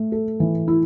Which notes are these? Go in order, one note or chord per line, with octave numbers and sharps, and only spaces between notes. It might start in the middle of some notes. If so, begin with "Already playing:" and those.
Already playing: A3
A4
E3
E4